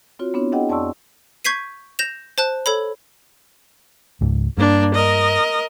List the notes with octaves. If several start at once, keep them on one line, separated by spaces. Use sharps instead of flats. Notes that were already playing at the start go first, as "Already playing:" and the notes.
C4 F4 F#4 C#5
B3 C4 D4 E4 C#5
D4 E4 G#4 D#5 F#5 G5
F2 D5 A5 C6 C#6 E6
C#6 G6 G#6 B6 C7 D#7
G6 A#6 E7 F7
C5 A5 F#6
A4 C#5 B5
C#2 G#2
G2 A#3 D4
A#4 D#5